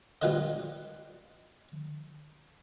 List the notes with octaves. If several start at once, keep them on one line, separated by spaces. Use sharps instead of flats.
A#1 G3 F4 B4 C5 D#5